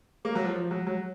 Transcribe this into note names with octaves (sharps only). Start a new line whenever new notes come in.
A#3
F#3
F3
F3
F#3
F#3